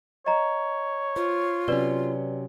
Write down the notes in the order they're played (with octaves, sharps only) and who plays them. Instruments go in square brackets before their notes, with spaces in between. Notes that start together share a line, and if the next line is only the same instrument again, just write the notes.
[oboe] C#5 [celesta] D#5 A#5
[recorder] F4 [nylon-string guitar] C5
[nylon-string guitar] C3 F#3 C#4 [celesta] B4 D5 G7